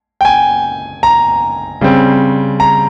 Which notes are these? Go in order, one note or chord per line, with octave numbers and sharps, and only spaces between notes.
G5
G#5
A#5
C#3 G3 C4
A#5